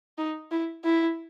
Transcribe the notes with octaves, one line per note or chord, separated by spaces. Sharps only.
D#4
E4
E4